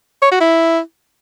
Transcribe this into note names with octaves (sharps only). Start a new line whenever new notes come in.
C#5
F#4
E4